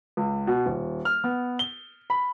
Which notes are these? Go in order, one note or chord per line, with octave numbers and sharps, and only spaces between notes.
C#2
B2
D#1
F6
B3
G7
B5